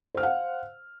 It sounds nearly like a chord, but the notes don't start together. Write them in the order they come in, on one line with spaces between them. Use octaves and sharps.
C5 F6 F5 F#5